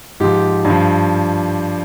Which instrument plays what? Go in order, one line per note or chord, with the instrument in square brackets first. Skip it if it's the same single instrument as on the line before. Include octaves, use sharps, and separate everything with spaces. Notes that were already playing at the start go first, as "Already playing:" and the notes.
[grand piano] G#2 F3 G4
G2
F3